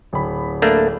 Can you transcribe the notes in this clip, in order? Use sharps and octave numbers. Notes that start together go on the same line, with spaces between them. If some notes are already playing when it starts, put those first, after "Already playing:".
D1 B5
A3 A#3 D4